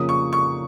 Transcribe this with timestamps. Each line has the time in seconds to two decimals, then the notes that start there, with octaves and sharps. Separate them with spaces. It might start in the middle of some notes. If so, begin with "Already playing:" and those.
Already playing: F2 C#3 F3 A#3 C#4 D#6
0.09 C#6
0.33 C#6